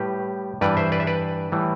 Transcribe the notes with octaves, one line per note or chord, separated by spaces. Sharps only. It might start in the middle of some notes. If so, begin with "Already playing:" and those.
Already playing: A2 G3 G4 B4
G2 E3 G3 B4 D5
C5 E5
B4 D5
E5
B4 D5
A2 E3 G3